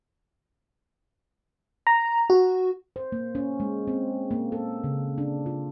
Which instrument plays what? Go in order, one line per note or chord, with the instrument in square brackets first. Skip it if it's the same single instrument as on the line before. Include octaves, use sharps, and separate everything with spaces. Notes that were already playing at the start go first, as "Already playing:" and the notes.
[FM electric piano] A#5
F#4
[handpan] C5
A#3
C#4
G#3
C4
A#3
A4
C#3
D4
F4